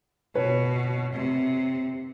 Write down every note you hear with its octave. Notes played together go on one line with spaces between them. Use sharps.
B2 B4 C#5
C3